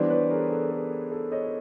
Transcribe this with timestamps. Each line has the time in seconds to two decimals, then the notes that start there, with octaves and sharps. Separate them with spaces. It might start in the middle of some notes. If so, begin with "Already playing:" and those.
Already playing: E3 G3 B3 D4 C5 D5
0.10 B4 C#5
0.30 G#4 A#4
0.51 A4
0.71 A4
1.12 A4
1.32 C#5 D#5